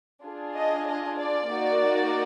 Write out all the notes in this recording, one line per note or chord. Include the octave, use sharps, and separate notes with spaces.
D4 F4 G#4
D#5
D#5
D5
A#3 D#4 F#4